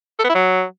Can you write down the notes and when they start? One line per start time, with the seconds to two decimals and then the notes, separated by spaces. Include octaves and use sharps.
0.19 A4
0.24 B3
0.30 E4
0.35 F#3